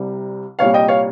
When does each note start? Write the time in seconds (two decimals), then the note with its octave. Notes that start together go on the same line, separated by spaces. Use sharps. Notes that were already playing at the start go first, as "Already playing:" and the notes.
Already playing: C2 C3 G3
0.59 C2 A#2 G3 C#5 F5
0.74 D#5 G5
0.88 C#5 F5